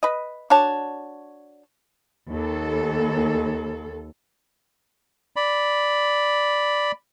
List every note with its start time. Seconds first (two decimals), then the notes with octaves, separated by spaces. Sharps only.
0.03 B4 D#5
0.50 D4 F#4 C#5 A5
2.29 D#2 A4
5.36 D5 B5